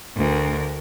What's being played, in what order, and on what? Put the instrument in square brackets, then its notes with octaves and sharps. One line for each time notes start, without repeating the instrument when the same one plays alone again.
[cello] D2 A#4